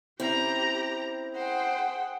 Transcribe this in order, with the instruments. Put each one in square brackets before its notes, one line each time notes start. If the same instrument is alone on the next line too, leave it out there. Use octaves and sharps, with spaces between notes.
[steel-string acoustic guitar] C4 [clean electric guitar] C#4 E4 [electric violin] G4 A#5
[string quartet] G#4 F#5 G5 [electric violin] C5